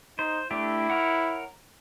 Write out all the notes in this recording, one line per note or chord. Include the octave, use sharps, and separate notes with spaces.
D#4 C5
A3 D4 E4 G4
A#4 C#5 F#5